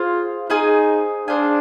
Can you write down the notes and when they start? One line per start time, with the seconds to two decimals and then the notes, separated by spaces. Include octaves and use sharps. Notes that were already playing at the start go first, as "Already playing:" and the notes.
Already playing: F4 G#4 C5 F5
0.50 D#4 G#4 C5 F5 G#5
1.27 D4 G#4 C5 F5 G#5